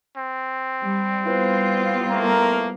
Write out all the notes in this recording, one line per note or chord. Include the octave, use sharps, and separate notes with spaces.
C4
G3
G3 B3 E4 F4 B4 C5
A3 A#3 A#4